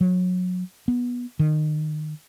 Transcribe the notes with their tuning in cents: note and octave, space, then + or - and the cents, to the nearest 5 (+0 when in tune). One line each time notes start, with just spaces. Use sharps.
F#3 -30
B3 -15
D#3 -25